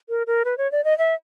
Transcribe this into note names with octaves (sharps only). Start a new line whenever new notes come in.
A#4
A#4
B4
C#5
D5
D#5
E5